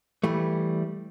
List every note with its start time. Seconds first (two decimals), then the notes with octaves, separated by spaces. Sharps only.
0.23 E3 G3 A3